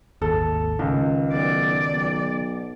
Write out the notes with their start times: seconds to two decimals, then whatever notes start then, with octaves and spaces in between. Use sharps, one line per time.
0.22 G#1 D#2 A4
0.79 C#2 D#3
1.32 B1 D5
1.94 B1